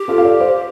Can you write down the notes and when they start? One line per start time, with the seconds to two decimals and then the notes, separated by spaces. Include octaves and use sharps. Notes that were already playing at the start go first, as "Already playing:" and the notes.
Already playing: G4
0.08 F4 A4
0.18 F5
0.25 A4 D5
0.40 C5 F5